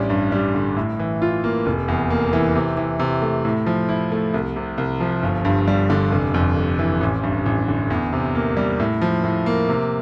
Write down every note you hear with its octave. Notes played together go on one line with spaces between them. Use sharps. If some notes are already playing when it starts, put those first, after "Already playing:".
Already playing: A1 G3 D4
G2
G3
D3
A2
E3
F4
A#3
F1
E2
A#3
E3
C3
E3
C3
A3
A2
F3
E4
A3
C2
C3
C2
F3
G1
G2
G3
D3
F1
F2
F1
E3
A1
G2
A1
D3
E2
C3
A#3
G3
A2
F3
A2
A#3
C3